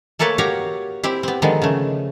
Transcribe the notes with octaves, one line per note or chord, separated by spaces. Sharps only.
A3 A#3 A4 B4 C#5 A5
F#4 G4 C#5 F5 A#5
C4 E4 G4
B3 C4
D3 D#3 F3 G#3 B3
C#3 A3